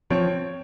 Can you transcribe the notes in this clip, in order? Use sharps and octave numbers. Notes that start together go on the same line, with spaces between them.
F3 C4 C#5